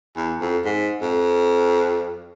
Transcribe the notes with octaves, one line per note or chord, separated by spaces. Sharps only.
E2
F2
G#2
F2